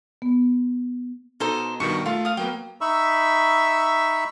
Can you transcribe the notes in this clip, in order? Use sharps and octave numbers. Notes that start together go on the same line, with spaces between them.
B3
B2 D#4 A4 C5
G2 B2 D#3 C#6
A3 F4
F5 D#6
F#3 A#3 B3 G5
D#4 E5 B5 C#6 E6